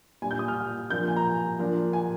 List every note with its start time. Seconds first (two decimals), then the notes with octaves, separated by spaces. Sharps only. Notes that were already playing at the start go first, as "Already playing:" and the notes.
0.22 A#2 G3 D4 G#5
0.31 G6
0.39 D#6
0.48 F6
0.90 F3 A#3 D4 G6
1.08 G#5
1.16 A#5
1.59 F3 A#3 D4
1.93 G#5